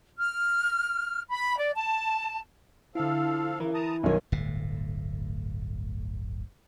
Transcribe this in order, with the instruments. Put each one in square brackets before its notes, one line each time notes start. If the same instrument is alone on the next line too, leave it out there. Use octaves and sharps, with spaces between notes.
[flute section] F6
B5
D5
A5
[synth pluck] D3 E4 [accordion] F3 A4 F5
[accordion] C#3 [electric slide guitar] E3 [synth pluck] A#4
[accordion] A5 A#5 D#6
[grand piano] B1 D#3 [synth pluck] G3 A4 C#5 [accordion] G#5
[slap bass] D1 G1 A2